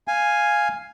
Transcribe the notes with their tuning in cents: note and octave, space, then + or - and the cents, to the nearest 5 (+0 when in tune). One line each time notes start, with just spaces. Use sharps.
F5 +0 G#5 +0